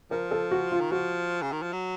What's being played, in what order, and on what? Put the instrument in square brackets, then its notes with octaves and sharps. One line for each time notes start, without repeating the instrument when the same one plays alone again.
[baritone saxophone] F3 [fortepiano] A#4
[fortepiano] A4
F#4
F4
[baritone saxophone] D#3
[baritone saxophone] F3 [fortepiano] F#4
[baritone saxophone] C#3
D#3
F3
F#3